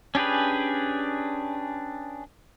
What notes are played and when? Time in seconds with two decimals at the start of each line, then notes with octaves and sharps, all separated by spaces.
0.15 C#4 D4 G4 G#4 B4